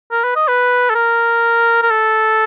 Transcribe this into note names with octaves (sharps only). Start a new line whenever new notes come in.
A#4
B4
D#5
B4
A4
A#4
A#4
A4